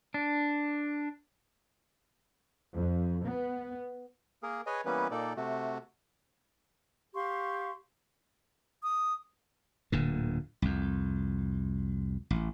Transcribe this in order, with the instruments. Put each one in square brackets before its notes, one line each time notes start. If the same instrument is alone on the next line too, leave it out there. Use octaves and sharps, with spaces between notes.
[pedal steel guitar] D4
[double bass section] F2
B3
[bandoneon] A#3 G#4 A#4
G#4 B4 C#5 D#5 G#5
E3 G3 A#3 B3 C#4 B4
A#2 A#3 D#4 A4 D5
C3 A3 F#4
[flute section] G4 F5 C6 C#6
[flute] D#6
[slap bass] D1 A#2 D3
C2 F2
A1